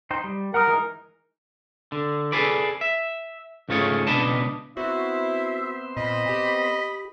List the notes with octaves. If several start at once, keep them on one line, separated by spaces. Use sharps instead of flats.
D#4 C5 G5
G3
A#4 F#5 A#5 D#6
E3 G#3 D#4
D3
G#4 A4 B4 D5
E5
C#2 G#2 A3 F4 G#4 C#5
C#2 B2 D4 B4 D#5 A5
B3 C4 E4 F#4 C5 E5
A#2 D#5 B5
G4